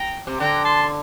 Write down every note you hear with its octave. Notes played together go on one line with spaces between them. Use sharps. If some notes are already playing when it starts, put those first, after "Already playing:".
Already playing: G5 A#5
C3
D3 G5 A#5
A5 C6